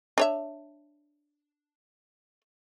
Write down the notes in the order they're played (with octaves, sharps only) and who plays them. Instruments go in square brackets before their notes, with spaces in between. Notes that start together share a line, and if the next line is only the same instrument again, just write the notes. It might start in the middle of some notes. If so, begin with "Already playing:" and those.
[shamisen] D4 C#5 E5